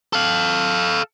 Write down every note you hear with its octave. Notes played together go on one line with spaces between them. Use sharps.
A4 F5